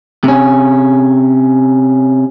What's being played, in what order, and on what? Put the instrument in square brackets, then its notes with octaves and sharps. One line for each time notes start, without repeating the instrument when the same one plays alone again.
[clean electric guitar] C3 C#4